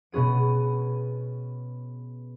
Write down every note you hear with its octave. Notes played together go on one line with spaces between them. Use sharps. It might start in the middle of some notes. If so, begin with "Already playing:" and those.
B2 B3 C#4 G#4 D#7